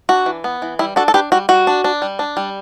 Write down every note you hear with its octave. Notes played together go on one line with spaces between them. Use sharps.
D4 F#4
E3
B3
E3
G3 E4
D4 F#4 A4
A4
D4 G4 B4
G3 F#4
G3 F#4
D4
D4
G3
D4
G3